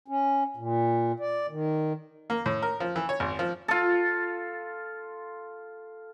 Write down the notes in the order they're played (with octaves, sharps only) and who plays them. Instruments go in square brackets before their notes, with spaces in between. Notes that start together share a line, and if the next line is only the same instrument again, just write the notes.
[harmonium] C#4
A#2
D5
D#3
[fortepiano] A#3
A2
A#4
F3
E3
C#5
G#1
F3
[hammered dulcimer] F4 A4